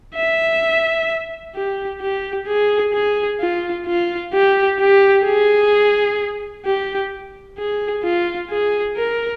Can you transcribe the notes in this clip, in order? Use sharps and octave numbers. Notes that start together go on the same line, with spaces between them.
E5
G4
G4
G#4
G#4
F4
F4
G4
G4
G#4
G4
G#4
F4
G#4
A#4